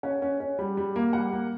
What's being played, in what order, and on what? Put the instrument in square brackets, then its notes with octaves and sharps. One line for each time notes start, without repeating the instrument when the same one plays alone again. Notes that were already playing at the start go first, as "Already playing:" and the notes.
[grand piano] C#4 F#5
C#4
C#4
G3
G3
A#3
G3 F#5
A#3